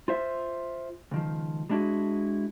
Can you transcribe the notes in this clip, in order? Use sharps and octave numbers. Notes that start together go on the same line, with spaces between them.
F4 C5 E5
C#2 D#3 F3
G3 G#3 D4 E4 F#4 G#4